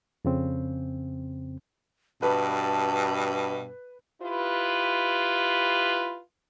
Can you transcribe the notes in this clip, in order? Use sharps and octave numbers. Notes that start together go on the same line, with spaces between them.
F2 C#3 C4
G2 B2 B4 A5
E4 F4 G4 B4